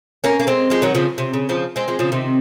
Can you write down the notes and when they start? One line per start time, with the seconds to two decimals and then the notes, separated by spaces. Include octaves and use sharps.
0.24 A#3 C#4
0.40 A#3
0.47 G#3 C4
0.70 F3 G#3
0.82 D#3 F#3
0.95 C#3 F3
1.18 C3
1.33 C#3
1.49 C#3 F3
1.76 G#3 C4
1.88 F3 G#3
1.99 C#3 F3
2.12 C3 D#3